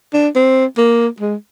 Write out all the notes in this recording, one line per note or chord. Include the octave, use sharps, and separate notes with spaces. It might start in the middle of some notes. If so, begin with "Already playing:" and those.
D4
C4
A#3
G#3